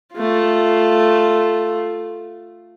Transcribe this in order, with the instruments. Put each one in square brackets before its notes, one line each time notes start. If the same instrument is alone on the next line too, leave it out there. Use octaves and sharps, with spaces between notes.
[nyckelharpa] A3 F4